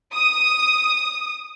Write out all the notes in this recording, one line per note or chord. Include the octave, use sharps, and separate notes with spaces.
D#6